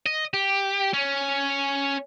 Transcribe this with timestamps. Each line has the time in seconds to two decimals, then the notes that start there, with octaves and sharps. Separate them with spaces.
0.06 D#5
0.34 G4
0.93 C#4